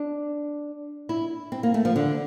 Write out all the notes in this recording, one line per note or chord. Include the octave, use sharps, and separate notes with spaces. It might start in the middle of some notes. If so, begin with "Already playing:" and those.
Already playing: D4
E4
C4
A#3
A3
F3
D3